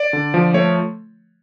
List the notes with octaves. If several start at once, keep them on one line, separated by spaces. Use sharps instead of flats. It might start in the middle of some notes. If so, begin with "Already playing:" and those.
Already playing: D5
D3
F3
A3 C#5